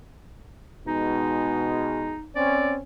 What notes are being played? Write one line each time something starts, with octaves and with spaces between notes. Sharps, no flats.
B2 G#3 D#4
C4 C#4 D5